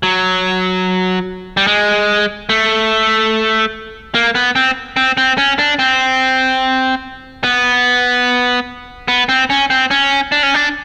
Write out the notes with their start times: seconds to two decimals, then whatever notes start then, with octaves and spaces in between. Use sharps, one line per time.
0.03 F#3
1.57 G3
1.67 G#3
2.49 A3
4.15 A#3
4.35 B3
4.56 C4
4.96 C4
5.17 C4
5.38 C#4
5.59 D4
5.79 C4
7.44 B3
9.08 B3
9.29 C4
9.50 C#4
9.70 C4
9.91 C#4
10.32 D4
10.43 C#4
10.54 D4